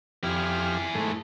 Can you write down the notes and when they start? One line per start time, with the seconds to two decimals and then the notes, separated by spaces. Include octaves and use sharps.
0.24 F2 E4 G4 G#4 F6
0.95 G#2 A3